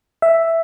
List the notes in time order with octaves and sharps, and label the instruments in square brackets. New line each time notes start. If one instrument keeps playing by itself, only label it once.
[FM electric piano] E5